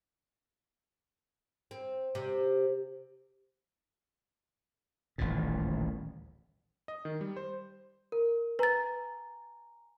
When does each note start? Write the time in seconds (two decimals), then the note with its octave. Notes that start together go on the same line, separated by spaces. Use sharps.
1.71 C4
2.15 C3
5.18 D#1 A1 D2 A#2
6.88 D#5
7.05 D#3
7.21 G3
7.37 C5
8.12 A#4
8.59 B4 G#5 A#5 A6